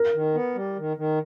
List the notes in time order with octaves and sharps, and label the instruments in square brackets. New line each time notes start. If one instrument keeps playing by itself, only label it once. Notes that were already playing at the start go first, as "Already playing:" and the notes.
Already playing: [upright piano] A#4
[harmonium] D#3
B3
G3
D#3
D#3